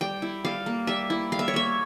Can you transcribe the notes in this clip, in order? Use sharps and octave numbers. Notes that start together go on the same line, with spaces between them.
G3 G5
E4
G3 F5
A#3
G3 E5
E4
G3 F5
E5
C#5
A#3 E5